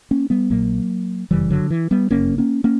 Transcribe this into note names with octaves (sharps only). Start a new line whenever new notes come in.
A#3 C#4
G3 B3
A#1 A#2 F#3 A#3
G1 F#2 C#3 E3 G3
D3 F#3
E3
G3 B3
G1 F#2 C#3 A#3 C#4
A#3 C#4
A#3 C#4